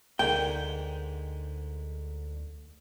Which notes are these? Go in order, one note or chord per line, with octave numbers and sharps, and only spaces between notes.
D2 G#2 D3 A#4 G5